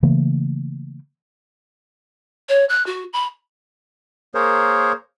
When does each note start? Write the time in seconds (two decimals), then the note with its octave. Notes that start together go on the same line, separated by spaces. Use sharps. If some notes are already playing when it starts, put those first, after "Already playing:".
0.03 C#3 E3 A3 A#3
2.49 C#5
2.69 F#6
2.86 F#4
3.13 B5
4.35 A#3 G#4 A#4 C5 C#5